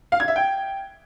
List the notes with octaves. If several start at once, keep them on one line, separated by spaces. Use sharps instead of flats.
F5
G#6
E5
G5